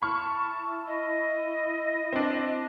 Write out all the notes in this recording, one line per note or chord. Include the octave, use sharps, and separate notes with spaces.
E4 A5 B5 C#6 F6
D#5
C4 D4